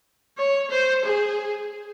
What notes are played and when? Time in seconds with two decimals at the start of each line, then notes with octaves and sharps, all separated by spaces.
0.38 C#5
0.71 C5
1.05 G#4